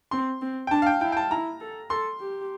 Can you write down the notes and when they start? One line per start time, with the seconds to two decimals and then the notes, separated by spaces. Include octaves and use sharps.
0.11 C4 C6
0.42 C4
0.67 G5
0.71 D4 A5
0.82 F5
0.86 G5
1.01 E4 G5
1.12 G5
1.17 A5
1.31 E4 A#5
1.61 A4
1.90 A4 C6
2.20 G4